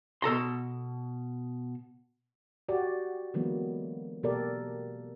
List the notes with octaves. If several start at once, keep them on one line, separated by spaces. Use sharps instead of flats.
B2 A4 A#5 C6
F#4 G4 D5
D3 E3 F#3 G#3 A#3 B3
B2 A#3 G4 A4 A#4 D5